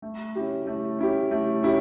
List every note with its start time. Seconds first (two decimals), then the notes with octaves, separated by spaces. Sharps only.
0.02 A3
0.35 C#4 E4 G4
0.67 A3
0.99 C#4 E4 G4
1.31 A3
1.63 C#4 E4 G4